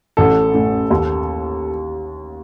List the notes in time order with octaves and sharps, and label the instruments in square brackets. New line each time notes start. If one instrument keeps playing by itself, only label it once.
[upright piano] A1 [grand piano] A4
[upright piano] A2 A3 C#4
D#2